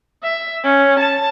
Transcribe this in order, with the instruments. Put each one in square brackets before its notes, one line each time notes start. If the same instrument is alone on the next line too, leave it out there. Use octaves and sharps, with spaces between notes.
[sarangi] E5
C#4
A5